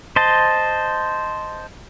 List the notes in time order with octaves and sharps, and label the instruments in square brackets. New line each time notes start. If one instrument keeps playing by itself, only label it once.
[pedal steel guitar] C5 D#5 A5